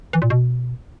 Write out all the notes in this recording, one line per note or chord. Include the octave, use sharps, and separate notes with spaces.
E3
A#2
B2